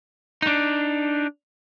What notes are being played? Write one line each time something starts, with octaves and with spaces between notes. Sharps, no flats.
D4 D#4